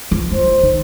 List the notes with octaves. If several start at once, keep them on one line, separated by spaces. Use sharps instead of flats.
F3
F3 C5
D#3